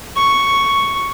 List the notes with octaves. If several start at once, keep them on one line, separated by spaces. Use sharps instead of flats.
C#6